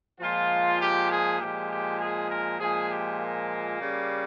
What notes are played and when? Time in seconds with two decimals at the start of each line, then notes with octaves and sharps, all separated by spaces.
0.20 A#2 F3 G#3 F4
0.80 G4
1.10 G#4
1.39 A#2 F3 G#3 G4
1.69 G4
1.99 G#4
2.29 A#4
2.58 A#2 F3 G#3 G#4
2.88 G4
3.19 A#3
3.78 C#3 G3